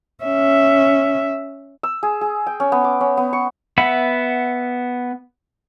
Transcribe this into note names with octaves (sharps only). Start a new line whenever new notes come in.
C#4 E5
E6
G#4
G#4
G5
C#4
B3
D6
C#4
B3
C#6
B3 E5 F#5 B5